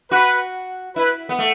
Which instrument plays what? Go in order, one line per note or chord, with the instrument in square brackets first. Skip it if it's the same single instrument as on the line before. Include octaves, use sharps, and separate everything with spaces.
[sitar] F#4 [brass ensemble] B4
[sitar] E4 [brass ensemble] B4
[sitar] B3
A3